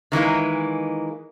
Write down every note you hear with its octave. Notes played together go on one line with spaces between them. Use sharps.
D#3 E3 G#3 A#3